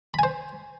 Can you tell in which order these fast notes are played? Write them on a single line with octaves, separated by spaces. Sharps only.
B5 G#5 C5